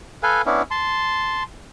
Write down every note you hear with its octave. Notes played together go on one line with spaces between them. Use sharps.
A4 B4 F5 G#5
B3 C#4 D4 E4
A5 C6